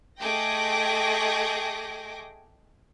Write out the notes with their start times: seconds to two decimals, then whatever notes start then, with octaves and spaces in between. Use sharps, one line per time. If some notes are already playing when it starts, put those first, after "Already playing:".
0.20 A3 G#4 D#5 G5 D6 A#6